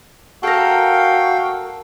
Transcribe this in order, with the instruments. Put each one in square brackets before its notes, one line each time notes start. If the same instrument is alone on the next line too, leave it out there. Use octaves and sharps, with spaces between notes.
[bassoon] F#4 [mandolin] A4 A#4 [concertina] F5 G5